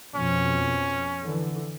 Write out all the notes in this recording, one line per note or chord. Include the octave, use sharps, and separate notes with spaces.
F2 B2 C#4
D3 E3